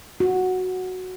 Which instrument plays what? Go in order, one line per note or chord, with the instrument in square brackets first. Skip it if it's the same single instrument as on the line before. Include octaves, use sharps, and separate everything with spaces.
[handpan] F#4